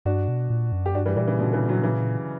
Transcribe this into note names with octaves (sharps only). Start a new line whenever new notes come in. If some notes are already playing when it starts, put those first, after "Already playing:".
G2 D4 F#4
B2
A#2
F#2
G4
G2 D4 F#4
E3 G3
A#2 E3 G3
C#3 E3
B2 D3
C#3 E3
D3 F#3
C#3 E3